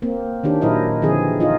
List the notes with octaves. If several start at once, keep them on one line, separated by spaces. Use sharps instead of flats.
A#3 C4
D#3 C#4 D4 G4
A#2 F#3 E4 A#4 C5 D#5
D3 E3 F3 C4 G#4
D#4 F4 D#5